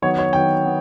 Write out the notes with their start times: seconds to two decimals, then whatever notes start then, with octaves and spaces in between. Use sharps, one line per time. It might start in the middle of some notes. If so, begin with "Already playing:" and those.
0.02 D#3 F#3 B3 C#5
0.18 C#5
0.33 D#3 F#3 B3 G5
0.65 B3